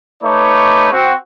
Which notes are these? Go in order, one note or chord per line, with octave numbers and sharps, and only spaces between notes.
A3 D#4 B4 C#5 D6
C4 F#4